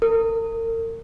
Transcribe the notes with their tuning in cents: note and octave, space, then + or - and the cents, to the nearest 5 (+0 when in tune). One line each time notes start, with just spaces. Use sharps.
A#4 -40